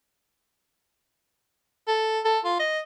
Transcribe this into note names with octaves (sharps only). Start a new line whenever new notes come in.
A4
A4
F4
D#5